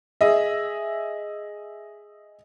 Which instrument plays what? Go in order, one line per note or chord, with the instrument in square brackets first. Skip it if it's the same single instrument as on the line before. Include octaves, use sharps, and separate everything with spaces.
[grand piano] G#4 D#5 E5